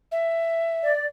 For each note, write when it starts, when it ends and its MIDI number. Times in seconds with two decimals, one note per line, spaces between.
0.12 0.93 76
0.83 1.06 74